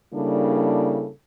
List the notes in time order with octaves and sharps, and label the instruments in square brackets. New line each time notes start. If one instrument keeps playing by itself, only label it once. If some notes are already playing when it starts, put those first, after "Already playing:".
[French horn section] C#3 G3 A#3 D4 E4 A4